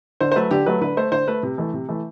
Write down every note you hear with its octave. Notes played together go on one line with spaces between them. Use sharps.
D3 C5
C5
F#3 A3 B4
D3 G4
F#3 A3 B4
D3 B4
A3 C5
D3 C5
A3 B4
C3
E3 A3
C3
E3 A3